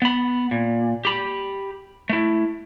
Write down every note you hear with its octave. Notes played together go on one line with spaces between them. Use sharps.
B3 B5
A#2
G4 B5
A3 E4